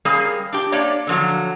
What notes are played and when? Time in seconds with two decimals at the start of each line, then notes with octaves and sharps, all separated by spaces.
0.05 G3 A#3 C#4 G#4
0.53 D4 G4
0.72 A#3 D4 C#5 D5
1.07 D3 F3 F#3